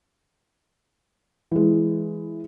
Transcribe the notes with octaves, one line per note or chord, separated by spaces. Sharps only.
E3 G#3